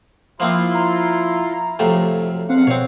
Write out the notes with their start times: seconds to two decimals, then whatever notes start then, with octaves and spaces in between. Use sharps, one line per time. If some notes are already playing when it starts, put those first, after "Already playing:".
0.40 F3 A#3 C4 E4 F4 C6
0.74 A#5
1.79 F2 C3 F#3 A3
2.49 E2 C4 F5 F#5
2.67 B2 C4 C#5